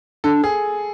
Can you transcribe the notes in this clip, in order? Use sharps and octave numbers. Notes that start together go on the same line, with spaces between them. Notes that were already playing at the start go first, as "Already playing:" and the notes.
D4 A4
G#4